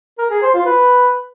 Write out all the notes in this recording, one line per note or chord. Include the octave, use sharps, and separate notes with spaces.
A#4
G#4
C5
F4
B4